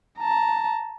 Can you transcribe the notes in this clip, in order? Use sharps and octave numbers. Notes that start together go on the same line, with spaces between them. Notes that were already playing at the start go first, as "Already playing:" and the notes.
A5 A#5